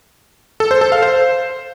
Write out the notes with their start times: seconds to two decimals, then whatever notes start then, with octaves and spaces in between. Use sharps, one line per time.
0.60 A4
0.71 C5
0.81 A4
0.92 F5
1.03 C5